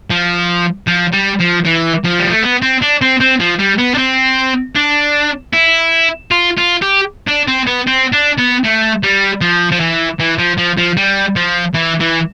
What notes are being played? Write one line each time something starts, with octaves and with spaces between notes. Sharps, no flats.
F3
F3
G3
F3
E3
F3
G3
A3
B3
C4
D4
C4
C4
F3
G3
B3
D4
C4
D4
E4
F4
F4
G4
D4
C4
B3
C4
D4
B3
A3
G3
F3
F3
E3
E3
F3
F3
F3
G3
F3
E3
E3